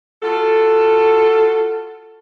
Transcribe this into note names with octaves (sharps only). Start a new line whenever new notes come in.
F4 F#4 A4